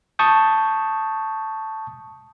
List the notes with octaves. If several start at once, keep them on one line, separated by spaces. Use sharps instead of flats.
A5 C#6 D#6 G6